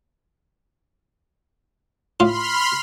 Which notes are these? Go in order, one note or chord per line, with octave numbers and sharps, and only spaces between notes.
A2 F4 B5 C6 F6